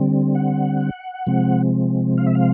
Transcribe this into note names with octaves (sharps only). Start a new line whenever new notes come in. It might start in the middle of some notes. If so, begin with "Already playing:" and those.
Already playing: D3 G3 C4
F#5
C3 F3 G#3 C4
F5
E5
F5